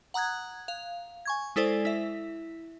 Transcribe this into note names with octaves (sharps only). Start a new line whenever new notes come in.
F#5 A#5 D#6 F#6 G#6
F5
G#5 C#6 G#6
G#3 E4 A4 C5 D5 G#5
E4 E5